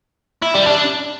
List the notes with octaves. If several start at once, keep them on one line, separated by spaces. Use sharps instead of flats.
E4
G3
D4